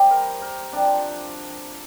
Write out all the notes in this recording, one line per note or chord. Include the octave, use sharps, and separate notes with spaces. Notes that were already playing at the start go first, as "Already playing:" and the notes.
Already playing: C3 G3 G4 C5
A#4
A#4
C3 F3 D4